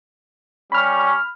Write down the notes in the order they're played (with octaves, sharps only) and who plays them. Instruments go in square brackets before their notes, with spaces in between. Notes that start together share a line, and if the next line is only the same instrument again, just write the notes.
[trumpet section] G3 C#4 C#6 [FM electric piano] B5 F6